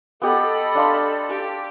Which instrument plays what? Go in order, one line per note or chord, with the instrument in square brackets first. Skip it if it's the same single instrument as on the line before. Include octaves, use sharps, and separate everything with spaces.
[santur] B3 G4 [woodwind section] A4 [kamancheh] D#5 B5
[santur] D4 F5 C6
[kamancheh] G4